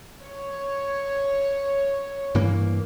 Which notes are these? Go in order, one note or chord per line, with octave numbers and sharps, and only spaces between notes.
C#5
G2 E3 A#3